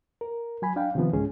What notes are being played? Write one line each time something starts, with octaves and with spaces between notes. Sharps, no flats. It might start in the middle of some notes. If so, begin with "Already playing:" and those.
A#4
F#3 G#5 B5
D4 F5 G5
C3 D#3 F3 B3
C2 G#2 C#3 G#3 C#4 G#4